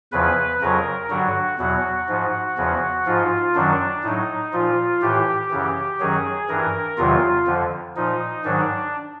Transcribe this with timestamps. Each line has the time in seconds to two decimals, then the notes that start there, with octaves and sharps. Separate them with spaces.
0.12 E2 C#3 F3 B4
0.61 F2 C#3 F#3 A#4
1.10 G2 D3 F#3 F#4
1.59 E2 B2 F#3 F#4
2.09 G#2 F3
2.58 E2 C#3 F3
3.06 G#2 F3 F4
3.55 F#2 D#3 F#3 D4
4.03 A2 F#3 D#4
4.53 A#2 F3 F4
5.02 A2 E3 G4
5.51 F#2 C#3 E3
6.00 F#2 D#3 F#3 G#4
6.49 G2 E3 A#4
6.97 E2 C3 D#3 F#3 F4
7.47 F2 D3 F3
7.96 A#2 F3 D#4
8.44 G#2 D#3 F#3 D4